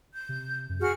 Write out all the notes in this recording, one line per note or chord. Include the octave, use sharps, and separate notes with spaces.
G6
C3
F#2
F#4 G#4 F6